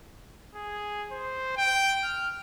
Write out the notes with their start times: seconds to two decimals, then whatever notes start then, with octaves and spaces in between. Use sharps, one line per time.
0.55 G#4
1.11 C5
1.57 G5
2.03 F6